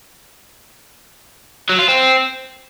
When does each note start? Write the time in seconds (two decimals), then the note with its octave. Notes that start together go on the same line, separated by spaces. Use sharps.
1.69 F#3
1.79 F4
1.88 C4